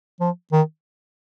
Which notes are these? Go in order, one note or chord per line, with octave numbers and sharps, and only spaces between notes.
F3
D#3